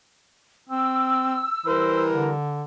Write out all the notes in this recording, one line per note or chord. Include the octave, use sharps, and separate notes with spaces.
C4 E6
E3 G3 A#4 C5
D3